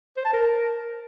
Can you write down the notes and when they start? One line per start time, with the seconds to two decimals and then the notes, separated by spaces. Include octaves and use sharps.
0.17 C5
0.25 A5
0.33 A#4